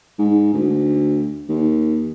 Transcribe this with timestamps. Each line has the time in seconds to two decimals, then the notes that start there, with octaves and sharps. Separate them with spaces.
0.19 G#2
0.54 D2
1.49 D#2